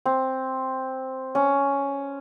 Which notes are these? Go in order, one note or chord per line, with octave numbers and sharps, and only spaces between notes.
C4
C#4